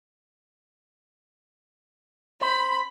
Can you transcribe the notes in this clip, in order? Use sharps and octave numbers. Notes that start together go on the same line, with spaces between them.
C5 B5